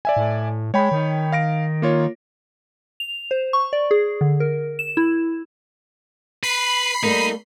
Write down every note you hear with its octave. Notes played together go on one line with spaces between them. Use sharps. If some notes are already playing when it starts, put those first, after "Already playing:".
D5 E5 G#5
A2
G#3 C#5 G5 B5
D#3
F5 A#6 D7
A#3 F4 C#5
F7
C5
C#6
D5
G#4
D3
A#4
E7
E4
B4 B5 C7
G3 A3 A#3 D#4